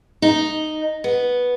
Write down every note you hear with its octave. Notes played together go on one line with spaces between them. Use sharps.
D#4
B3